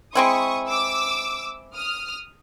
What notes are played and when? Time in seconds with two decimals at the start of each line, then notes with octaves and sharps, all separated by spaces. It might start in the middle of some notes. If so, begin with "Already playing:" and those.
0.15 G#3 C4 E4 C#6 D#6
0.68 D6 E6
1.74 D#6 F6